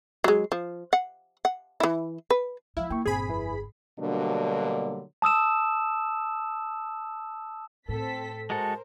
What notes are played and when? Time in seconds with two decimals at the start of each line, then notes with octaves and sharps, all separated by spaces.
0.24 F#3 G#3
0.52 F3
0.93 F#5
1.45 F#5
1.80 E3 E4
2.30 B4
2.77 F3 G#3 E4 F5
2.90 A#3 G5 C#6
3.06 G1 A#2 C4 G#4 B5
3.28 F2 E4 B4
4.00 B2 D3 F#3 G3 A#3 D4
5.22 A5 D#6 E6 E7
7.89 A2 C4 A4 B6
8.50 G#3 F#4 A4 A#4 C5 A5